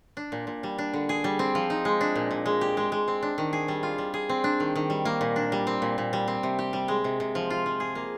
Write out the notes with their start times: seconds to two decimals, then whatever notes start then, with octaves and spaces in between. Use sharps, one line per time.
0.17 D4
0.32 A#2
0.47 A#2
0.63 G3
0.78 D4
0.93 D3
1.09 G#4
1.24 G3
1.39 C4
1.55 F3
1.70 D#4
1.85 G#3
2.01 D4
2.16 A#2
2.31 A#2
2.46 G#3
2.61 G4
2.77 G#3
2.92 G#3
3.08 C4
3.23 D4
3.38 D#3
3.53 G#4
3.68 G3
3.83 F4
3.98 G3
4.14 G#4
4.29 C4
4.44 D4
4.60 D#3
4.76 D#3
4.90 G3
5.05 A#3
5.21 A#2
5.36 D4
5.52 G3
5.67 C4
5.82 A#2
5.98 A#2
6.13 G3
6.28 C4
6.43 C3
6.59 G4
6.73 G3
6.88 G#3
7.04 C3
7.20 C3
7.35 F3
7.50 F4
7.66 F3
7.80 G#4
7.95 A#3